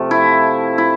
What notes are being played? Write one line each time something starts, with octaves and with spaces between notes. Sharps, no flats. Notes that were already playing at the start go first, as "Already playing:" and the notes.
Already playing: C3 F3 A3
E4
E4